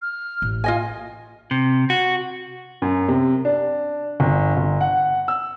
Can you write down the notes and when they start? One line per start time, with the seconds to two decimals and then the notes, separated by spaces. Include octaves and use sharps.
0.02 F6
0.42 A1
0.64 F4 D#5 G#5
1.51 C3
1.90 F#4
2.82 F#2
3.08 C3
3.45 D4
4.20 G1
4.57 G1
4.81 F#5
5.28 E6